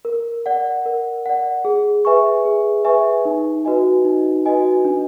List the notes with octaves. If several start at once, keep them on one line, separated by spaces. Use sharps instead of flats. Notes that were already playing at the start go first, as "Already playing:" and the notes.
A#4
D5 F#5
A#4
D5 F#5
G#4
B4 E5 G#5 C#6
G#4
B4 E5 G#5 C#6
D#4
F#4 B4 D#5 G#5
D#4
F#4 B4 D#5 G#5
D4